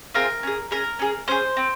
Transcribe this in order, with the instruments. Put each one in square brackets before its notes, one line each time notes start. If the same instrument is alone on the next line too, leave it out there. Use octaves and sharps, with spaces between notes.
[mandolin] C4 F4 G#4 A#4
C#4 G#4
C#4 G#4 A#4
C#4 G#4
C#4 G#4 C5
C4